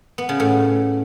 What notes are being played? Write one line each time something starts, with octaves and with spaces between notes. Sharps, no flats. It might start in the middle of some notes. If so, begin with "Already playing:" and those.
B3
C#3
A2